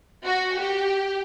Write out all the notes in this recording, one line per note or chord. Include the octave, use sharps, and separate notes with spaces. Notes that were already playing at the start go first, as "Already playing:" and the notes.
F#4
G4